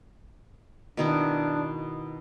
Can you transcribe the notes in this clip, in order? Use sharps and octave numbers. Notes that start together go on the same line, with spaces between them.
B2 D#3 D4 E4